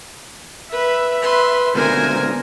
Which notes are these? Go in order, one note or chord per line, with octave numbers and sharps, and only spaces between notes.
B4 E5
B4 C6
C#2 B2 D3 A#4 C5 G#5